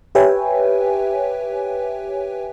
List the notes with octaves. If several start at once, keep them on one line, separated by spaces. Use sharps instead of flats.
G4 B4 C#5 E5 G5 G#5